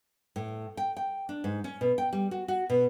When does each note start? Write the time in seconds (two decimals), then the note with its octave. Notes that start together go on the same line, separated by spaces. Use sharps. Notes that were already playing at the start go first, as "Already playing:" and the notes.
0.36 A2
0.77 G5
0.97 G5
1.29 D4
1.44 G#2
1.64 C#4
1.81 B2
1.98 G5
2.13 G3
2.31 F#4
2.48 F#4
2.70 B2